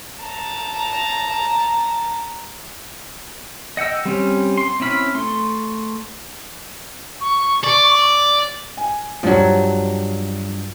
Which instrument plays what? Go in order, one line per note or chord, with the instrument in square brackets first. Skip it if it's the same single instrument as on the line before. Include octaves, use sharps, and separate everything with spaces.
[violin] A5 A#5
[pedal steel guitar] D#5 F#5 G5 E6
G3 C4 C#4
C6
C4 C#4 E4 B5 F6
A3 C6
[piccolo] C#6
[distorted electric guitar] D5
[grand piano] G#5
[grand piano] G2 [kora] F3 F#3